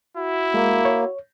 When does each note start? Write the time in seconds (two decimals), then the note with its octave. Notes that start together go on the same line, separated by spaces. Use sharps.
0.17 E4 F#4
0.54 G#3 A#3
0.85 C#5